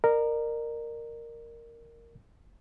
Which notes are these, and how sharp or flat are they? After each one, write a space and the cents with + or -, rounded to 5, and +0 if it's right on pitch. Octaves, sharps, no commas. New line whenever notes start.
A#4 -5 D5 +45